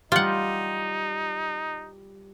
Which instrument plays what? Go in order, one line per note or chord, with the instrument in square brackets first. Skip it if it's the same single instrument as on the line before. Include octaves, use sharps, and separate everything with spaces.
[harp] G3 G4 [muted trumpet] D#4 [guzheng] F4 F#5